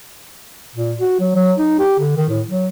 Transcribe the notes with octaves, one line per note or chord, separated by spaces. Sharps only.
A#2
F#4
F#3
F#3
D#4
G4
D3
D#3
A2
F#3